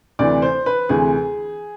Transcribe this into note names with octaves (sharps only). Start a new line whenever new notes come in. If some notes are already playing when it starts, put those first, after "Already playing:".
D2 C3 E3 D5
C5
B4
D2 C3 E3 G#4